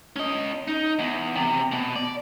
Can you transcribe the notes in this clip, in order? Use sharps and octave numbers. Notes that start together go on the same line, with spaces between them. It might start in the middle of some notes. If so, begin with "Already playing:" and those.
C#4 D#5
D#4
E2
C3
B2
D5